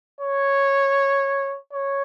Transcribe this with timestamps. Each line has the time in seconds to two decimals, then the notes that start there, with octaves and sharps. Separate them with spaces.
0.20 C#5
1.72 C#5